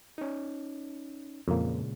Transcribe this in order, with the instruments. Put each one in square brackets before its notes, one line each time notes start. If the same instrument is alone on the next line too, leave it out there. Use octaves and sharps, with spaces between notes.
[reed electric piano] C#4 D#4
[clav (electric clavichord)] F2 A#3 [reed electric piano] A#2 C#3 G#3